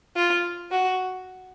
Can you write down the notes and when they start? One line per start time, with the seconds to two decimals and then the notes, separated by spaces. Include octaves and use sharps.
0.16 F4
0.71 F#4